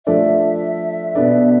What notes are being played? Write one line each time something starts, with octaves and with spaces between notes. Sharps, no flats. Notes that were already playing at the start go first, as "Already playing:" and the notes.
F3 A3 D4 A4 D5 E5
B2 B3 D4 A4 D5